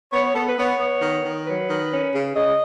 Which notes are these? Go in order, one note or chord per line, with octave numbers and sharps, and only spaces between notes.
B3 C#5
C#5
B3 A4
B4
B3 C#5
B3
D#3
D#3
F#3 B4
D#3
C#4
C#3
C#3 D#5